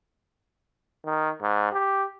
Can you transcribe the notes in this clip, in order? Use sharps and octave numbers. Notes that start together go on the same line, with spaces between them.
D#3
G#2
G4